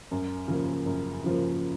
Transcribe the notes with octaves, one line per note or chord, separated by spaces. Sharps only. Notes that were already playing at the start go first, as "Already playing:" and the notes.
F#2
C#3 F3 A#3
F#2
C#3 F3 A#3